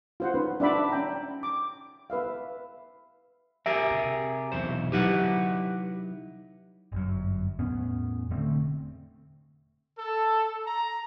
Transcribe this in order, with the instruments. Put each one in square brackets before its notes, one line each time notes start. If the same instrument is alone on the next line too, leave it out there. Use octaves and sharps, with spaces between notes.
[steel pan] F4 C5 F#5
C#4 D#4 B4
D4 D5 E5 F#5 B5 D6
C#4 G5 A#5
D6
B4 E5 F5
[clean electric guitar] G4 G#4 A#4 [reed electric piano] E5
[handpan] C3
[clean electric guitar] B1 E2 C5
[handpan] F#3 D#4 E4 [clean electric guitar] G4 B4 F#5
[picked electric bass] G1 F#2
E2 A2 B3 C#4
E1 D3 A3 C4
[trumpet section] A4
A#5